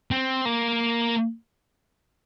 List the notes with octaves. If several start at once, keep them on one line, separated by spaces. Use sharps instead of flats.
C4
A#3